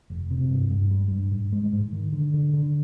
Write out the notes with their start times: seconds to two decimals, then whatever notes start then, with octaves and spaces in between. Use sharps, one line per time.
0.10 F1
0.31 C3
0.50 G2
0.71 G2
0.91 G3
1.11 G2
1.32 G#2
1.52 G#3
1.73 G#2
1.92 D#3
2.12 D3
2.34 D3
2.53 D3